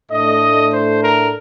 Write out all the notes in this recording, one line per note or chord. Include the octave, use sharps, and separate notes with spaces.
A2 A3 D4 D#5
C5
A#4